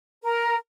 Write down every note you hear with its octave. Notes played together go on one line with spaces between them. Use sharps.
A#4